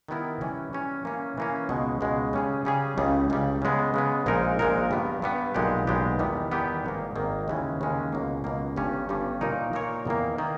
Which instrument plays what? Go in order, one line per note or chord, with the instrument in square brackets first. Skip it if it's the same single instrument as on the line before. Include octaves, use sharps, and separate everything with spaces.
[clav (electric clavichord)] D#3 G3 B3 E4 A#4
E3 G3 C#4
E3 G3 C#4
E3 A#3 C#4
E3 A#3 C#4
C#2 B2 G#3
C#2 B2 G#3
C#3 G3 C#4 G#4
C#3 G3 C#4 G#4
C#2 C#3 G3
C#2 C#3 G3
C#3 G#3 B3
C#3 G#3 B3
A#1 A#2 G#3 D#4 A#4
A#1 A#2 G#3 D#4 A#4
G2 G3 B3
G2 G3 B3
B1 A#2 G#3 B3 G4
B1 A#2 G#3 B3 G4
E2 D#3 G3 B3 G4
E2 D#3 G3 B3 G4
G#1 G#2 D#3 A#3
G#1 G#2 D#3 A#3
D#2 C#3 E3 G#3 C#4
D#2 C#3 E3 G#3 C#4
C#2 B2 A#3
C#2 B2 A#3
G1 G2 G3 C#4
G1 G2 G3 C#4
A#2 A#3 D#4 A#4 C#5
A#2 A#3 D#4 A#4 C#5
E2 D#3 A#3
D#3 A#3